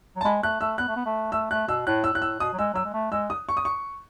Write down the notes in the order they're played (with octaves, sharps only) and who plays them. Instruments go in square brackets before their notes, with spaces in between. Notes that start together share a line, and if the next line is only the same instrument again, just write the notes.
[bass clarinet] F#3
[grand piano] A5
[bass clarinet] G#3 [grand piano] B5
[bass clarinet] A3 [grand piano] F#6
[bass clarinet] A3 [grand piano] E6
[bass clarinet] B3 [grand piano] F#6
[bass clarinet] A3
B3
A3
[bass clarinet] A3 [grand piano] E6
[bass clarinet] A3 [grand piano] F#6
[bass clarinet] B2 [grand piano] E6
[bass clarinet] A2 [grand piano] F#6
[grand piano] E6
[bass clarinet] A2 [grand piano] F#6
[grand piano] E6
[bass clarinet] B2 [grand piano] D#6
[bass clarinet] F#3
[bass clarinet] G#3 [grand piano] E6
[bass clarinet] F#3 [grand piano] E6
[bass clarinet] G#3
A3
[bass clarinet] G#3 [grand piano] E6
[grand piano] D#6
C#6
D#6
C#6